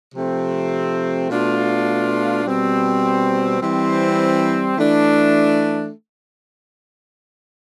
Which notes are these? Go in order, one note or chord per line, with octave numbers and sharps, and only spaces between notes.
C3 F3 A3 C4
B2 A3 D4 F4
B2 G3 C4
E3 G3 C4
E3 A3 D4